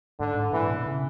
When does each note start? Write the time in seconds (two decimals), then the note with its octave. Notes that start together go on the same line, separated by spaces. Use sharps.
0.19 G#2 D3
0.36 G#2
0.53 A#2 E3
0.69 B2
0.86 C#3